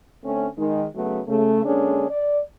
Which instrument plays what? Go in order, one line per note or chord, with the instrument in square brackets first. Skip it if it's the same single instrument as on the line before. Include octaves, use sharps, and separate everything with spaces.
[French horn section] D3 A3 C4 C#4
D#3 G#3
C#3 F#3 A3 B3 F#4
C#3 A3
D3 G#3 A#3 C#4 D4 G#4
D5